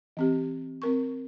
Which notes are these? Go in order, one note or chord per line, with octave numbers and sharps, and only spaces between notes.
E3 C4 G4
C4 A#4 C#6